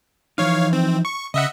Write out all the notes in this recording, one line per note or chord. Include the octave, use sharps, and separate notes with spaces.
E3 F3 D#4 C#5 F5
C4
C#6
C#3 D#5 E5 F#5